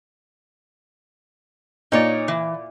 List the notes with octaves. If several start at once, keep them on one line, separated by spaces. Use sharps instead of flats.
A#2 D#4 C#5 D5
E3